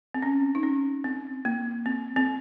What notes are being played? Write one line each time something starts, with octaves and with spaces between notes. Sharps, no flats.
C4
C#4
D#4
C#4
C4
A#3
C4
C4